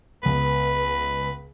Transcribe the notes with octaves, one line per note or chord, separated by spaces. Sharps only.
C#2 B3 B4